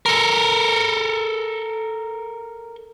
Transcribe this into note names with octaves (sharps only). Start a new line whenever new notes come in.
A4 A#4